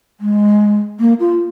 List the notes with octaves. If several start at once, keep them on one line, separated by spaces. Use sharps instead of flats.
G#3
A#3
F4